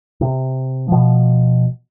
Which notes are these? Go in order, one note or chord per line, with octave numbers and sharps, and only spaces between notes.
C3
B2 F3